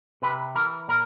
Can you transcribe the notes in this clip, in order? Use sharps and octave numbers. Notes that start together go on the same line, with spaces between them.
C3 B4
E3 A#4
A#2 A#4